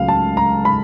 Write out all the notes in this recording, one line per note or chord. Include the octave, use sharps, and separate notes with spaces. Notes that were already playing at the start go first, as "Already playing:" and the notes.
Already playing: C#2 C#3 F#3 A3 F5
A5
A#5
B5